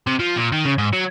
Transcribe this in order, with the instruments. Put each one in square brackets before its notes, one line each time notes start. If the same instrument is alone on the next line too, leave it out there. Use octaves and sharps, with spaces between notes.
[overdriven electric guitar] C3
F3
A#2
D#3
C#3
G#2
F#3